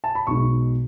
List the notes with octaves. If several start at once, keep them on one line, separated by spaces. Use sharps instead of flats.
A5
B5
B1 B2 G#3 D#4 C#6